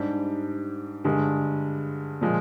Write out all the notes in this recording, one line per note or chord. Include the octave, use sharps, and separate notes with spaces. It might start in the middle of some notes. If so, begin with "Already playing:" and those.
Already playing: G#2 G3 D4 G4
G2 D3 G#3
A#2 F3 G#3